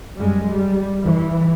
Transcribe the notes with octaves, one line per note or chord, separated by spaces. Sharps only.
F#2 G3 G#3
G3
E3